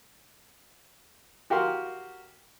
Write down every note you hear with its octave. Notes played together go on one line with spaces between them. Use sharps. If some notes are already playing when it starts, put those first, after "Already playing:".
F#4 G4 A#4 F5 C6